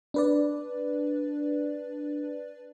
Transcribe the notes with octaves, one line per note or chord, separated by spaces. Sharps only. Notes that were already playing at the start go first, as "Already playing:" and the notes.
D4 B4 D5